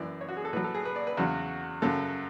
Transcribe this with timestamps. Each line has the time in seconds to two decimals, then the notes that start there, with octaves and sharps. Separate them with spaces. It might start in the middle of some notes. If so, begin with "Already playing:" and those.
Already playing: F#2 E3 D5
0.21 C#5
0.29 F#4
0.37 G#4
0.45 A4
0.53 A2 F#3 B4
0.64 A4
0.74 G#4
0.85 B4
0.96 D5
1.07 B4
1.17 E2 C#3 F#3 F#4
1.82 F#2 C#3 F#3 A4